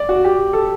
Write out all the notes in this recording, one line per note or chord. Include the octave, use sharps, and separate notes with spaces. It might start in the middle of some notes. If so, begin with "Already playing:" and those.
Already playing: D5
F#4
G4
A4